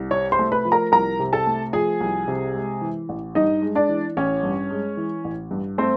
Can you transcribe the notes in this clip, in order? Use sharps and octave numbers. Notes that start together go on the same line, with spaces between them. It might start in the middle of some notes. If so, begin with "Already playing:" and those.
Already playing: C2
C3 C#5 C#6
C5 C6
A3
B4 B5
F3
A#4 A#5
C2 A#4 A#5
C3
A4 A5
A3
F3 G#4 G#5
C2
C3
G#3
E3
A1
G2 D#4 D#5
G#3
D4 D5
E3
A1 C#4 C#5
G2
G#3
E3
A1
G2
A3 C4 C5